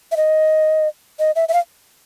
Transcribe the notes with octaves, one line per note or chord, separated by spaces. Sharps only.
E5
D#5
D#5
E5
E5
F5